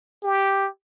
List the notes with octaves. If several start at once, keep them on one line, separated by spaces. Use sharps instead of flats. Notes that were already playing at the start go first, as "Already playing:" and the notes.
G4